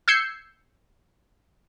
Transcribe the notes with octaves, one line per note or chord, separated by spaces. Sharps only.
E6 G6 G#6 C7 C#7